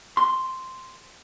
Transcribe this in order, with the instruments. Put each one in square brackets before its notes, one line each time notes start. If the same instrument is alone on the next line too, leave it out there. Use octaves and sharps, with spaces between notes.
[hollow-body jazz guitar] C6